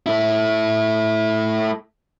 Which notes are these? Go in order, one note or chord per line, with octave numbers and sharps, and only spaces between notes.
A3 E4